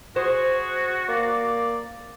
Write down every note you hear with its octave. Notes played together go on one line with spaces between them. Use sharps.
F#4 G#4 C5
A#3 D5